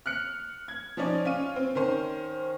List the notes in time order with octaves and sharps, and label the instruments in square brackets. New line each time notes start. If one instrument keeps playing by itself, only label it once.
[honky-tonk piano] F6 F#6 C#7
G#6
F3 C#4 D#4 D5
C#4 F4 D#7
C4
D#3 C#4 C5